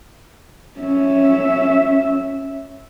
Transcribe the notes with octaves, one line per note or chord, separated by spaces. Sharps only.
C#4 E5